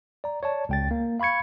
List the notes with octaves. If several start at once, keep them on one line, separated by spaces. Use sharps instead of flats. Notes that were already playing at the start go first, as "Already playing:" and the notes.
D5 A#5
C#5 D5 A5
C#2 G5 A6
A#3
F5 B5 C#6 G#6 C#7